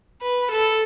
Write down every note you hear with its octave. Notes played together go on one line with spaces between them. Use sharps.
B4
A4